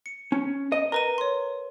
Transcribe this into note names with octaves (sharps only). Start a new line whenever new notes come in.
C#7
C#4
D#5
A#4 B4 A#5 D#7
C#5 C6